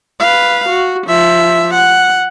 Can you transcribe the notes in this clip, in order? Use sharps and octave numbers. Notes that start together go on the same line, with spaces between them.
B4 F5
F#4
F3 E5
F#5